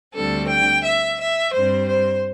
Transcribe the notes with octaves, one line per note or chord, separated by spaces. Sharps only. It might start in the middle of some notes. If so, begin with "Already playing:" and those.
D2 D3 G3 C4 A4
G5
E5
E5
G2 G3 C4 C5
C5